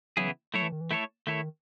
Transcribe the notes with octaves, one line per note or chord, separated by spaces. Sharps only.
C#3 E3 F#3 B3 E4 G#4
F#3 A3 E4 A4 C#5
E3
D#3
E3
A3 E4 A4 C#5
D#3 A3 E4 A4 C#5